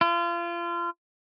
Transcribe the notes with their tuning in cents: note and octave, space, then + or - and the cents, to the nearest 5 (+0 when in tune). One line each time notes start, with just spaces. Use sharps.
F4 -30